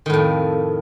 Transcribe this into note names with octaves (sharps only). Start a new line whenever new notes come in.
F2 A2 D#3